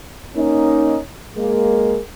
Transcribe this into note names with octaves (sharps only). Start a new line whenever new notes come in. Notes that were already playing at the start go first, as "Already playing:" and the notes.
A#3 C#4 D#4
G#3 A#3